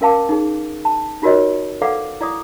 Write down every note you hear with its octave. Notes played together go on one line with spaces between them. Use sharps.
C#4 A#4 F5 A5 D6
D#4 G#4
A5
D#4 F4 F#4 A#4 C#5 D#5
A4 B4 D5 F5 F#5 D6
E4 D5 D6 D#6